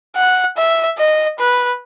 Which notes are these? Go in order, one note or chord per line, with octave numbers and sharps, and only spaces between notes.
F#5
E5
D#5
B4